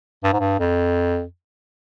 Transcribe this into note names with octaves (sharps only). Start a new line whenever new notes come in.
G2
G#2
G2
F2